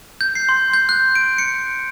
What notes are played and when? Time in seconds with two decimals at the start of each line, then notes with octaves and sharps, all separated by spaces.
0.21 G6
0.35 C7
0.49 C6
0.73 G6
0.89 F#6
1.15 D7
1.38 C#7